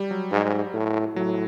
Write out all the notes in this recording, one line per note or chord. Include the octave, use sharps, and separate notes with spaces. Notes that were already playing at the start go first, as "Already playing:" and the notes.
Already playing: G3
F#3
G#2
A2
A2 F#3